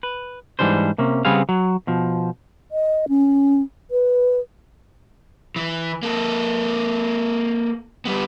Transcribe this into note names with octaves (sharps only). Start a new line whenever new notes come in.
B4
G#2 C#3 E3 G3 D4 C5
C3 A#3 C#4
C#3 G3 B3 C4 G#4 F5
F#3
B2 F3
D#5
C#4
B4
E3
A#3 A4
G3 B3